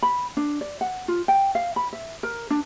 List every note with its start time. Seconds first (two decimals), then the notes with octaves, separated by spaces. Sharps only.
0.02 B5
0.37 D4
0.61 D5
0.81 F#5
1.08 F4
1.28 G5
1.55 F5
1.76 B5
1.93 E5
2.23 A#4
2.50 D4